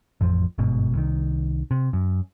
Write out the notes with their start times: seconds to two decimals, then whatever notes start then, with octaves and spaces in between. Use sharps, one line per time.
0.21 A1 F2 F3
0.58 G1 G#2 B2
0.95 C2 D#3
1.71 C3
1.93 F#2